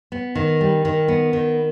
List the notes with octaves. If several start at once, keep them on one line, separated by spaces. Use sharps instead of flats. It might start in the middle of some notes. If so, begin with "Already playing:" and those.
B3
D#3
G3
D#3
B3
D#3